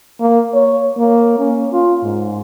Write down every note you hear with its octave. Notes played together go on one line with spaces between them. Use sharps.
A#3
C#5
A#3
C#4
F4
G#2